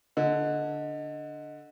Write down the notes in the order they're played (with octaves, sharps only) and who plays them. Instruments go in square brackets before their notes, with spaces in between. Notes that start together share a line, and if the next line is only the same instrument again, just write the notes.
[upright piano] D3 [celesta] D#5